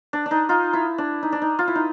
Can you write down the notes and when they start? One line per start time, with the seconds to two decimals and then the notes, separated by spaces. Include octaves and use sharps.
0.13 D4
0.26 D4
0.31 D#4
0.49 D#4 F4
0.73 E4
0.98 D4
1.23 D#4
1.32 D4
1.42 D#4
1.59 F4
1.68 E4
1.75 D#4